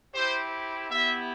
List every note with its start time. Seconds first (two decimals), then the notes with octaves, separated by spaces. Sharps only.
0.14 C4 E4 G4 C5
0.89 B3 E4 G4 E5